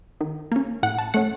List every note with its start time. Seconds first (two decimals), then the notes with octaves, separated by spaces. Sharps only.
0.21 D#3
0.52 A#3 C#4
0.83 A2 F#5
0.98 A5
1.14 A3 C#4 F#5